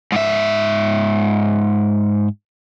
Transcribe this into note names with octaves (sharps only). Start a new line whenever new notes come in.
G#2 E5